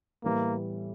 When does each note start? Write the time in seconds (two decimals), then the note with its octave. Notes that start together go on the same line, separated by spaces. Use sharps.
0.23 A2 E3 G3 A#3 B3